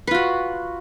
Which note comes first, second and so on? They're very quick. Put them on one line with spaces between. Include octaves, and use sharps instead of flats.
B4 F4 F#4